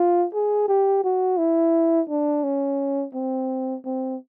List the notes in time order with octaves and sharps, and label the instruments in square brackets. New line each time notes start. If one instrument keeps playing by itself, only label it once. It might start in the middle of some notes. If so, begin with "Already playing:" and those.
Already playing: [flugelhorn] F4
G#4
G4
F#4
E4
D4
C#4
C4
C4